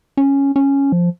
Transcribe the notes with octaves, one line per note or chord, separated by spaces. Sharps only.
C#4
C#4
F3